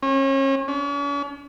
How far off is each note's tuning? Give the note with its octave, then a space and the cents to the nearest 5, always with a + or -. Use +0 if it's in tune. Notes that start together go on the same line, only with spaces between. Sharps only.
C#4 -35
C#4 +45